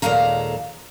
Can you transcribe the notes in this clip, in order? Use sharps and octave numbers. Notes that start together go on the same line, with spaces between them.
D#2 A#2 G#3 A4 F5 A#5